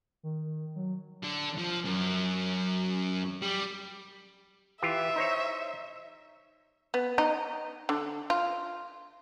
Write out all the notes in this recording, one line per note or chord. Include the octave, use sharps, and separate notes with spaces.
D#3
F#3
D3
F3
F#2
G3
E3 F4 G4 E5
D#4 C5 C#5
B3
D#4
D3
F4